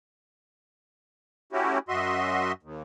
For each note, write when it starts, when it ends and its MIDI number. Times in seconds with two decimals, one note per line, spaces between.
1.53 1.78 57
1.53 1.78 61
1.53 1.78 64
1.53 1.78 66
1.53 1.78 67
1.89 2.52 42
1.89 2.52 66
1.89 2.52 75
1.89 2.52 76
1.89 2.52 84
2.63 2.82 39